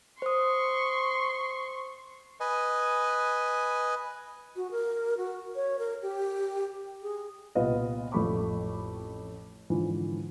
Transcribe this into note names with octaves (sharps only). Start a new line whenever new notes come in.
C5 C6 C#6 D#6
B4 D#5 G#5
F#4
A#4
F#4
C#5
A#4
G4
G#4
C2 A#2 B3 F4 B4 D#5
A1 F2 A3 B5 C#6 D6
G#2 D3 E3 F3